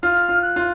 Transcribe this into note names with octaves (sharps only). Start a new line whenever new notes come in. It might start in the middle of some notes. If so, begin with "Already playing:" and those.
F4 F6
F4
F#6
F4